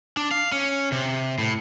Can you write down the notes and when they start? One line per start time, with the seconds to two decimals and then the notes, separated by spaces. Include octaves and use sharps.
0.17 D4
0.32 F5
0.52 C#4
0.92 C3
1.38 A2